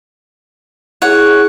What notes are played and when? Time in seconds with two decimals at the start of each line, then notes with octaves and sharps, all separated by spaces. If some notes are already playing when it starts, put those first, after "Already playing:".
1.02 E4 G#4 C#5 F#5